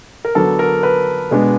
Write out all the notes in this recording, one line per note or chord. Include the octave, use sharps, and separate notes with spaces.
A#4
D3 F#3 B3 D4 A4
A#4
B4
B2 G#3 B3 D4